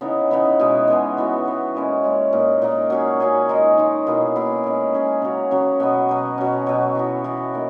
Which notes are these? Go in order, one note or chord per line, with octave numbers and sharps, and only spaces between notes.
C#3 E3 B3 D#4
C#3 E3 B3 D#4
B2 G#3 B3
B2 G#3 B3
E3 B3 F#4
E3 B3 F#4
A#2 G#3 C#4
A#2 G#3 C#4
A#2 A#3 D#4
A#2 A#3 D#4
F#3 C#4 G#4
F#3 C#4 G#4
D#3 G#3 D#4
D#3 G#3 D#4
B2 A#3 E4 G#4
B2 A#3 E4 G#4
G#3 C#4 G#4
G#3 C#4 G#4
C#3 F#3 C#4
C#3 F#3 C#4
B2 F#3 B3
B2 F#3 B3
B2 F#3 C#4
B2 F#3 C#4
E3 B3 F#4
E3 B3 F#4
D#3 A#3